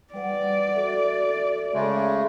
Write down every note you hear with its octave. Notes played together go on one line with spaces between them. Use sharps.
G3 B4 D5 F#5
F#4 A4 E5
C#3 G#3 A3